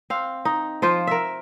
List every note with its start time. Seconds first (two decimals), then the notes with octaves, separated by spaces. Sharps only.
0.10 C4 F5
0.45 D#4
0.82 F3 F4 C5
1.07 A#4 E5